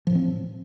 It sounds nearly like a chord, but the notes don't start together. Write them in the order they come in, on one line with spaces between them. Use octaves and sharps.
F3 A2 E3 C4